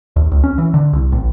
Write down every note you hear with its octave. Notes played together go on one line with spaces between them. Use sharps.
D#2
C#2
C#4
E3
D3
C2
A1